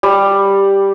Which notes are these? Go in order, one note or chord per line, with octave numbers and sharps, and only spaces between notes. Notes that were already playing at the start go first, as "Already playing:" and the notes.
G3